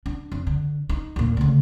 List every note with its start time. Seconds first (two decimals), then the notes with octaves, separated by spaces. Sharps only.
0.06 D4
0.32 F2
0.47 D3
0.89 D#4
1.16 D#2 A#2
1.37 D2 C#3